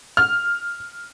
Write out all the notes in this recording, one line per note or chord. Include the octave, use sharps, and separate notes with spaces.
F6